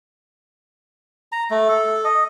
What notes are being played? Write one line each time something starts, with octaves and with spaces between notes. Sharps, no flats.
A#5
A3
A4
D#5